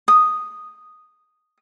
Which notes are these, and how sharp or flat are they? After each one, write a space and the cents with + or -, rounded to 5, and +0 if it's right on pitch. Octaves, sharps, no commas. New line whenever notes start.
D#6 -5